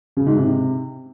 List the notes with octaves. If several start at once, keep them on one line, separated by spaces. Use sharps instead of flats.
C#3
G#2
C3